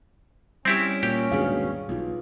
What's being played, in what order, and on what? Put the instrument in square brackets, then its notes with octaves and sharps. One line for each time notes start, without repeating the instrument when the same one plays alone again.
[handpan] G3 [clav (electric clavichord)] C4 E4 G4 [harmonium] C#4
[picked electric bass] A#2 [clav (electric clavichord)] G4
[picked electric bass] D#2 G#2 B2 [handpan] D4 G#4 F5
[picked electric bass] B1 [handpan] B3 D#4 F4